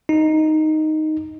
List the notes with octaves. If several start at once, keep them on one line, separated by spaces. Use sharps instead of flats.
D#4